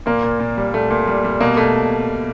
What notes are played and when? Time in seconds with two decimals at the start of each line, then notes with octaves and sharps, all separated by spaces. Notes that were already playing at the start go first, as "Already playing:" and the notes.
0.06 A#2 A#3
0.23 A#2
0.39 A#2
0.57 G3
0.73 A#2 A3
0.91 A#2
1.07 G3
1.24 G3
1.41 B2 A#3
1.57 B2 A3